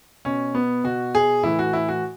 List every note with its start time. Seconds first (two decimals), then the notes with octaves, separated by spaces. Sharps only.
0.25 B2 C#4
0.55 B3
0.84 B2 F#4
1.15 G#4
1.43 A2 E3 E4
1.59 F#4
1.73 E4
1.89 F#4